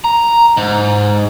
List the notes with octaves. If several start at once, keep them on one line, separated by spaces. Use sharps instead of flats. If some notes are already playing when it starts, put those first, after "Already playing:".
A#5
G#2